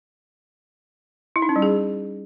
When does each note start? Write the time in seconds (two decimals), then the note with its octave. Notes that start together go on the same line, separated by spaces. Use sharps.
1.36 E4
1.42 D#4
1.49 C#4
1.56 G3
1.62 G#4